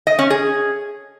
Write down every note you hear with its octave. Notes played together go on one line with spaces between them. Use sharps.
D#5
C#4
G#4